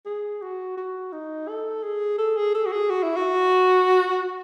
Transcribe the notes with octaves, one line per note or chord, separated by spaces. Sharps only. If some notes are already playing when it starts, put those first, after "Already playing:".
G#4
F#4
F#4
D#4
A4
G#4
A4
G#4
A4
F#4
G#4
F#4
E4
F#4